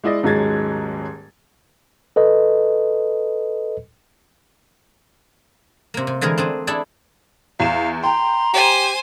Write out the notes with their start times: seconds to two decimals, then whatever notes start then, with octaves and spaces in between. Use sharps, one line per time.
0.04 G#3 E4 D5 D#5
0.23 D#1 G#2 F#3 G#3 G#6 A6
2.16 A4 B4 D#5
5.94 C3 A#3
6.07 C3
6.21 D3 E3 G#3 G#4 A#4
6.38 C4 D4 G#4
6.67 D4 E4 G#4 A4 D5
7.60 E2 F5 E7
8.04 G5 A#5 C6
8.53 G4 C5 G#5